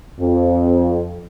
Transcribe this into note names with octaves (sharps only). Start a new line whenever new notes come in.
F2